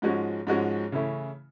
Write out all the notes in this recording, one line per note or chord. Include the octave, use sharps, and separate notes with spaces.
G#2 F3 G#3 C#4 F#4
G#2 F3 G#3 C#4 F#4
C#3 E3 A3 C#4 E4